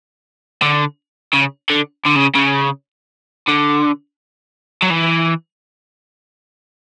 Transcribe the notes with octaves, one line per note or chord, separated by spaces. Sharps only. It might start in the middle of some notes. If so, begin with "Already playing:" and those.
D3
C#3
D3
D3
C#3
C#3
D3
F#3
E3